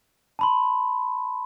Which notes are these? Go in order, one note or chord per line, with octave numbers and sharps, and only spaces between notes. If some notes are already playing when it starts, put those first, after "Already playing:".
A5 B5 C6